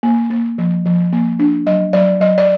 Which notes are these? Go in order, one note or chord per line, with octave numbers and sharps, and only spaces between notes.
A#3
A#3
F3
F3
A#3
D4
F#3 D#5
F#3 D5
F#3 D#5
D5